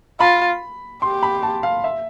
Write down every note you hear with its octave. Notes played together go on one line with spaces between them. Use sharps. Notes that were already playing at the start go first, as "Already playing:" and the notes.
F4 B5
G4 C6
B5
A5
F5
E5